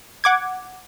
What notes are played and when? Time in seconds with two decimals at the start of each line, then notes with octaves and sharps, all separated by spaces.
0.24 F#5 D6 G#6